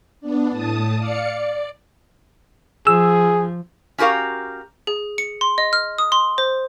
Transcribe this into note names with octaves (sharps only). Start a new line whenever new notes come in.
B3 D4
A2 A5 D#6
D5 F5 C#7
D5
F3 G#4 E6
C#4 F#4 G4 A#4 F5
G#4
C#7
C6
D#5
F6
D#6
C6
C5